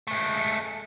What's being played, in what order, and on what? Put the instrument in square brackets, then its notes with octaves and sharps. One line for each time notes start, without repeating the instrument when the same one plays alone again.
[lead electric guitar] G#3 A3